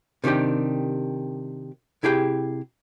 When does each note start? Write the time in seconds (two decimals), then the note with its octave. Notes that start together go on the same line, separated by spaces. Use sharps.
0.24 C3 D#3 D4 G4 G5
2.03 C3 E4 G4 G#4 G5